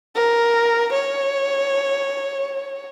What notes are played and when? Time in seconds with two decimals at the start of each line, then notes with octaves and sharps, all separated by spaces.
0.16 A#4
0.93 C#5